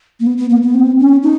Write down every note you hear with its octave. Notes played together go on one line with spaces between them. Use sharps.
A#3
B3
B3
A#3
B3
C4
C#4
D#4